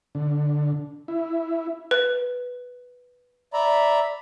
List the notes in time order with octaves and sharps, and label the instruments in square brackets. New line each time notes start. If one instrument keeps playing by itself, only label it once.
[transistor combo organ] D3
E4
[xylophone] B4
[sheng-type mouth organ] D5 E5 A#5 B5